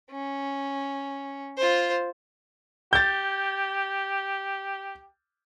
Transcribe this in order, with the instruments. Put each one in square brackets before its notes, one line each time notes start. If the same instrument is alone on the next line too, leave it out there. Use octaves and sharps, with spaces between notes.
[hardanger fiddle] C#4
F4 C5
[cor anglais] G4 [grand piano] G6 A6